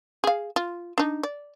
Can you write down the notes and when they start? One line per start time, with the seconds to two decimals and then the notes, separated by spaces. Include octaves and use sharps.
0.24 G#4 F5
0.56 F4
0.98 D4 D#4
1.23 D5